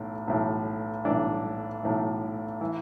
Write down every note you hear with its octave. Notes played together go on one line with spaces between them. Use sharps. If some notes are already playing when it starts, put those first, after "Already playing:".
Already playing: B1 A2 E3
B1 A2 E3
B1 A2 E3 D4
B1 A2 E3
E3